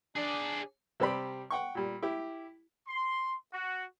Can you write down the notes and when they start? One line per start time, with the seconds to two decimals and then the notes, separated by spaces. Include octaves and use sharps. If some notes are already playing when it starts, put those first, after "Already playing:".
0.16 D4 G#4 D5
1.00 C3 G3 C4 G4 D5 B5
1.51 F#5 G5 C#6
1.75 A#2 G3
2.03 E4 G4
2.88 C6
3.54 F#4